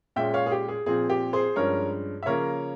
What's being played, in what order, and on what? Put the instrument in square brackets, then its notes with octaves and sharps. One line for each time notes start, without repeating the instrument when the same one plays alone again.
[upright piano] A#2 G#3 C#4 E5 G5
C#5 F5
G#4
G4
G#4
A#2 F3 C4 G#4
G4
G#4 C5
G2 F3 G#3 C#4 A#4 C#5
E5
C#3 F3 A#3 C#4 A#4 C#5